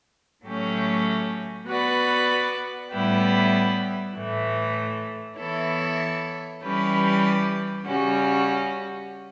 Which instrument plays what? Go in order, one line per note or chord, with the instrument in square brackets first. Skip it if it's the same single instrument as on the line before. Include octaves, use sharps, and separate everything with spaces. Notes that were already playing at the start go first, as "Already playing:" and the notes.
[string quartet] A2 F#3 A3 C#4 G4
B3 F#4 B4 D5
A2 G3 B3 E4 G4
A2 E3 A3
E3 B3 E4 A4 C#5
E3 G3 C#4 G4 B4
C#3 G3 C#4 F#4